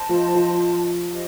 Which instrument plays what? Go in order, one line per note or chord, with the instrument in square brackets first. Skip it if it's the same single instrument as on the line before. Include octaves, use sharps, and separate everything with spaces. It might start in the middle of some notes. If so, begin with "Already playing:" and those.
Already playing: [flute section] C5 D#5 A5 C6
[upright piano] F3
F3
[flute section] G4 C5 D#5